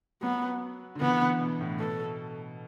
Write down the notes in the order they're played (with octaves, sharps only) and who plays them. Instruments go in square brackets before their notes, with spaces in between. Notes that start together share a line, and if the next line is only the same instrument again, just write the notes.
[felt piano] F#3 [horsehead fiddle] B3
[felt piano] D3
[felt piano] E3 [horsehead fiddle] B3
[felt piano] D3
B2
A2
[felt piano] B2 [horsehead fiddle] A4